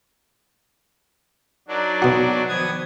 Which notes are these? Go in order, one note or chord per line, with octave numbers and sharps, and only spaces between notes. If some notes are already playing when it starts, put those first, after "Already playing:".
F#3 D4 D#4 A#4 D5
B2 F#4
D#3 F3 B3 D#6 G#6